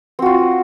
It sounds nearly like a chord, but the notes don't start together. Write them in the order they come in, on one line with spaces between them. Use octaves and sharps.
C4 F#4 F4